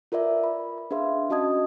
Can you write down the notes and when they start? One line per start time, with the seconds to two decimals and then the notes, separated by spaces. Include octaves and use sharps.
0.12 F4 A#4 B4 D5 E5
0.44 B5
0.78 B5
0.91 D4 G#4 B4 E5 F5 C6
1.30 C#4 F#4 D#5 A5 D#6 G#6